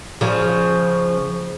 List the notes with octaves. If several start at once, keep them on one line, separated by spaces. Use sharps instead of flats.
C#3 F3